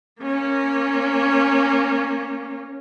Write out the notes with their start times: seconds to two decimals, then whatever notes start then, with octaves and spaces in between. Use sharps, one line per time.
0.21 A#3 C#4